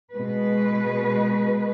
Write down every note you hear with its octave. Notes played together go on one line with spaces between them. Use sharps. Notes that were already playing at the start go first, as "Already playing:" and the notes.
B2 G#3 B4